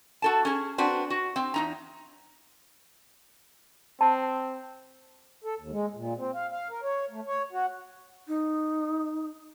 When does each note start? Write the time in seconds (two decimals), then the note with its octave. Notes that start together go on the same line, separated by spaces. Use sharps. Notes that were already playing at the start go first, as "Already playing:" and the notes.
0.22 F#4 A4 A5
0.45 C#4 G#4
0.78 C4 D4 F#4 B4
1.10 F#4
1.36 C4
1.54 E2 D#4 A#5
4.01 C4 A5
5.44 A4
5.59 D#2
5.71 G#3
5.95 A#2
6.17 C4
6.34 F5
6.51 F5
6.70 A#4
6.83 C#5
7.10 A3
7.27 C#5
7.52 F#4
8.28 D#4